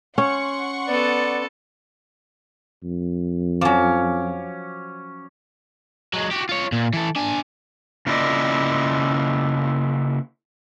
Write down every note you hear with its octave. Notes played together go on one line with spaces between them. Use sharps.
C#4 F#5 C6 C#6
B3 A4 D5
F2
F3 F#3 C#4 D6
F#3 G#3
F#4 G4
F4 C#5
A#2
E3 A4
D4 G#5
C#3 A#3 E4 F4 D5 D#5